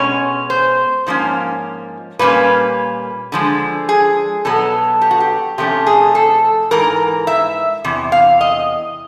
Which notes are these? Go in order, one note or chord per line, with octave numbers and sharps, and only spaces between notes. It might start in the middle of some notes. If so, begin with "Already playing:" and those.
Already playing: B2 G#3 C#4 C#5
C5
G#2 F3 A#3 C#4
A#2 G3 A#3 C#4 B4
D3 F3 G#3
G#4
B2 F#3 B3 A4
G4
F#4
G4
C3 F3 A3 C#4 G4
G#4
A4
G#2 E3 A#4
E5
E2 C3
F5
D#5